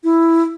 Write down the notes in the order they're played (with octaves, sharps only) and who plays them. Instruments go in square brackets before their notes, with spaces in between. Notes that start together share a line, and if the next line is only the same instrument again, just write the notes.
[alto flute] E4